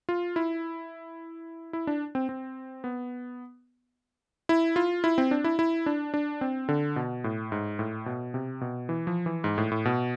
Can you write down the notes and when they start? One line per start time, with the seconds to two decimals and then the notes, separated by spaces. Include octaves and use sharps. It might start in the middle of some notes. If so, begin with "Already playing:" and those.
0.09 F4
0.36 E4
1.73 E4
1.87 D4
2.15 C4
2.29 C4
2.84 B3
4.49 E4
4.76 F4
5.04 E4
5.18 C4
5.31 D4
5.44 E4
5.59 E4
5.86 D4
6.14 D4
6.41 C4
6.69 D3
6.96 B2
7.24 A2
7.52 G#2
7.79 A2
8.06 B2
8.34 C3
8.61 B2
8.89 E3
9.07 F3
9.26 E3
9.44 G#2
9.58 A2
9.72 A2
9.85 B2